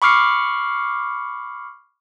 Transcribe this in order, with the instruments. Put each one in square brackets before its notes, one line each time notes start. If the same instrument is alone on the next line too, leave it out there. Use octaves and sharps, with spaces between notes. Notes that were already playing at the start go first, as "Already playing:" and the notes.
[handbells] B5 C#6 D6 F6 C7 C#7